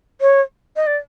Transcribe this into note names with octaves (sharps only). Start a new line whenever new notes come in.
C#5
D#5
D5